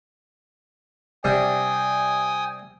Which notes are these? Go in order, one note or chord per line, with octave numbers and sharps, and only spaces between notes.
C3 G3 D4 G5 G#5 D#6